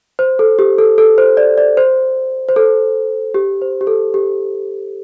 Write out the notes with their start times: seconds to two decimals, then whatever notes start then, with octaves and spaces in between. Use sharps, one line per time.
0.19 C5
0.39 A4
0.59 G4
0.78 A4
0.98 A4
1.18 C5
1.37 D5
1.58 D5
1.77 C5
2.49 C5
2.56 A4
3.34 G4
3.62 C5
3.81 G4
3.87 A4
4.14 G4